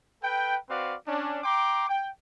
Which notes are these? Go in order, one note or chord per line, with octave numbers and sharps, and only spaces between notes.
A4 B4 G5
C4 F#4 B4 D5 F5
C#4 D4
G5 A#5 C6 D6
G5